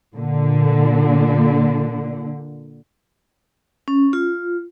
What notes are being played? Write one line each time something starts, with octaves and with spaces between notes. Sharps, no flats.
A#2 D3
C#4
F4